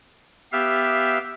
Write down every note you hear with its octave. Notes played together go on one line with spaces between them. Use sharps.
B3 G4 E5 F5